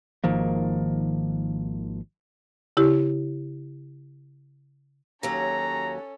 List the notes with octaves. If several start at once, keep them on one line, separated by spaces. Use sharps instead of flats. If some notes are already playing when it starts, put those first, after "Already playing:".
G#1 D#3 F3 A#3
C#3 E4 G4
D#2 F#3 C#4 A4 A#5